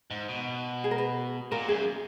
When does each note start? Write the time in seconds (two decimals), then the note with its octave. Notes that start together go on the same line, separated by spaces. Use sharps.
0.10 G#2
0.29 B2
0.84 G#4
0.91 A#4
0.98 B4
1.52 A#2 A#4
1.68 F#2 G#4